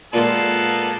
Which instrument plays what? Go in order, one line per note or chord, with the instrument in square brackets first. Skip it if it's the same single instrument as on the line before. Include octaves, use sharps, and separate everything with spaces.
[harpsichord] A#2 G#3 [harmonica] A#3 B3 A4